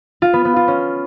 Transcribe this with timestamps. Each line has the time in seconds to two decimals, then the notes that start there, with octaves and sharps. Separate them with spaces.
0.22 F4
0.33 B3
0.45 B3
0.56 F4
0.68 C#4